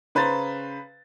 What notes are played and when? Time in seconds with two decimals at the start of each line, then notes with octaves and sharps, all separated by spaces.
0.15 C#3 B4 C5 A#5 A6